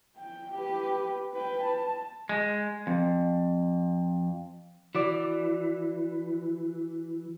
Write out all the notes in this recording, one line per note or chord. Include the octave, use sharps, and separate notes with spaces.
G5
G4 B4
B4 G5
A5
G#3
F2
E3 F#4 D5